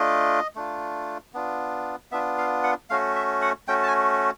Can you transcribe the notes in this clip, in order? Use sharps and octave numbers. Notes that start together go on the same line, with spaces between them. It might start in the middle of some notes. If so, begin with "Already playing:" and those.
Already playing: A3 D4 F4 D#5
A3 D4 F4
B3 D4 F4
B3 D4 F4 E5
F5
F#5
A3 C#4 F#4 F5
E5
F#5
A3 C#4 F#4 G5
A5
G#5